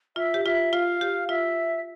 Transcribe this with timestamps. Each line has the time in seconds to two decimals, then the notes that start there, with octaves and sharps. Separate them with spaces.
0.16 F4 E5
0.34 G4
0.45 F4 E5
0.73 F4 F5
1.01 G4
1.29 F4 E5